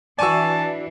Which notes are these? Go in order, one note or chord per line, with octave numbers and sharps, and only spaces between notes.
E3 D4 F#4 D5 G#5 A5 C#6 E6